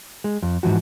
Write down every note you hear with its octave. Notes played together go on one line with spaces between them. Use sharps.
G#3
F2
G#2 E3 F3 F#4